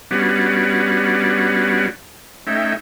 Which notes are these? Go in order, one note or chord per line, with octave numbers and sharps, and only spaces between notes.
G3 B3 C#4 D4 F#4
A3 C#4 D#4 E5 G5